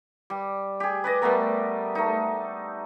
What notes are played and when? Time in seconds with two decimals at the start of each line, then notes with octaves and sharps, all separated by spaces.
0.30 G3
0.80 G4 G#4
1.04 B4 D5 D#5
1.22 G3 A3 B3 A#4
1.95 A3 D#4